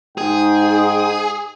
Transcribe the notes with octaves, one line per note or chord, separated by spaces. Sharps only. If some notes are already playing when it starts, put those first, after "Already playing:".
G#2 D#4 G#4 G5